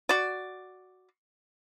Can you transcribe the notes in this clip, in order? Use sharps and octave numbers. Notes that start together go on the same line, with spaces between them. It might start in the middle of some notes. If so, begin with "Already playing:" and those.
F#4 D5